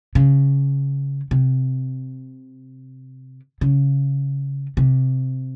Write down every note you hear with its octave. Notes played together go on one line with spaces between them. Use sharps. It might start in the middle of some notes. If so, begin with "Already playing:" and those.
C#3
C3
C#3
C3